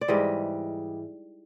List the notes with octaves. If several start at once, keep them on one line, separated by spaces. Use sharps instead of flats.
D5
G#2 E3 G3 D#5